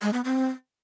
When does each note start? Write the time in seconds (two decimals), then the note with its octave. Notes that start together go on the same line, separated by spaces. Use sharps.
0.02 G#3
0.13 B3
0.25 C4